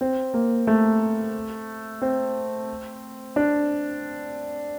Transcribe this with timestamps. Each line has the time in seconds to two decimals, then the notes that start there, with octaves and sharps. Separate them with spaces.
0.01 C4
0.34 A#3
0.67 A3
2.02 C4
3.36 D4